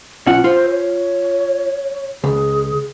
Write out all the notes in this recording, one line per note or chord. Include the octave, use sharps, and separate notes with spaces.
B1 C#4 F4 F#5
F4 C5
C#5
C#2 G#4